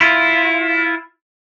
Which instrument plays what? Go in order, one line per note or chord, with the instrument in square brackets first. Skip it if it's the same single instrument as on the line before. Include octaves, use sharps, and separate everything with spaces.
[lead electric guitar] E4 F4